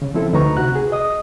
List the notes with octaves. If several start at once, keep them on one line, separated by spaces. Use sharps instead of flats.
C#3
F3 C4 E4 A4
D2 D#4 B4 A#5 C#6
C3 F#4 F#6
G#4
D#5 D#6